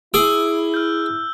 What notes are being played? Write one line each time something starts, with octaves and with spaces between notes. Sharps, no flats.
E4 G#4 D6 E6
F6 G6